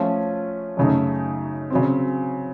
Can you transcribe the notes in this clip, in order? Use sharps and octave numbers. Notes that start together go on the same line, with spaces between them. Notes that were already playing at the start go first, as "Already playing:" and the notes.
Already playing: F3 A3 C#4 F4
F#2 C#3 A3 D#4
C#3 F#3 C4